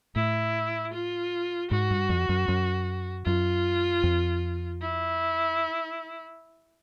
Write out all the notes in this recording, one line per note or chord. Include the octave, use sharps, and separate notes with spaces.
A2 E4
F4
G#2 F#4
G2
F2
F#2
F#2
F#2 F4
F2
E4